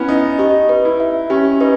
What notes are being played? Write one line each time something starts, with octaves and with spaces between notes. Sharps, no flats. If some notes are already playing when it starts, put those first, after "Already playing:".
Already playing: B3 C#4 E4
D#4 D#5
D#4 G4
B4
E4
E5
C#4 G4
D#4 B4